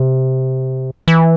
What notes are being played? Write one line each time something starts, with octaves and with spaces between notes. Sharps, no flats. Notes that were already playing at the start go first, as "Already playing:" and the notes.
Already playing: C3
E3